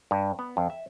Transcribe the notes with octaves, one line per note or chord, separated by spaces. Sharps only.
G2
B3
F2
E5